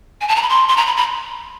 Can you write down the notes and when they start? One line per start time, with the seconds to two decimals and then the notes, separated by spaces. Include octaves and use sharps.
0.21 G#5
0.28 A5
0.36 A#5
0.42 B5
0.49 C6
0.68 C6
0.77 A#5
0.86 B5
0.97 B5